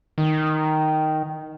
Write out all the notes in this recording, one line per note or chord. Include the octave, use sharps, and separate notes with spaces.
D#3